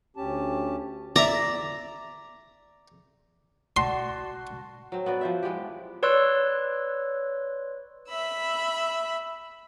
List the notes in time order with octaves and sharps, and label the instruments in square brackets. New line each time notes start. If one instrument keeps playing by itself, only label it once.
[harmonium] D2 C#4 G4 A5
[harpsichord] D5 E5 [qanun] A#5
[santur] F#4 [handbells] D5 A5 [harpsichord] C6
[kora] F#3 C4
B3 F#4 D5
F3 C5 E5
E3 G#3 B3 G4
[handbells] B4 C#5 D5 C6 E6 F#6
[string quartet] E5 B5 E6